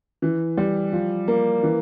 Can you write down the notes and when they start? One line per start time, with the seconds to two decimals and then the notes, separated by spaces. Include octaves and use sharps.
0.22 E3
0.58 G3
0.93 F3
1.28 A#3
1.63 E3